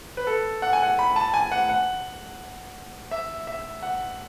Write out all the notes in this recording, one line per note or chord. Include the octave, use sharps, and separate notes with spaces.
B4
A4
F#5
G#5
F#5
B5
A5
G#5
F#5
F#5
E5
E5
F#5